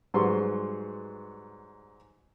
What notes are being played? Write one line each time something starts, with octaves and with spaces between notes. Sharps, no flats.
G#2 F#3 G3 B4 C6 C#6